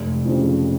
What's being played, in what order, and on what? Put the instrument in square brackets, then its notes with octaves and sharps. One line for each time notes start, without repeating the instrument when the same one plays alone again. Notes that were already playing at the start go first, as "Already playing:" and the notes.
Already playing: [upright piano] F1
F2 C#3